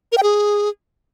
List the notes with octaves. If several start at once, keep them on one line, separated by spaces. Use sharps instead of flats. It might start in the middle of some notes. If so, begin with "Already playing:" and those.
A#4
G5
G#4